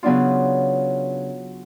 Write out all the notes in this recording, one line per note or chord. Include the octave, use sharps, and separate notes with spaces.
C#3 F#3 B3 D4 F4